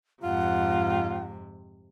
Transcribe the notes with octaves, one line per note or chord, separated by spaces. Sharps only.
F2 G#2 C3 F4 F#5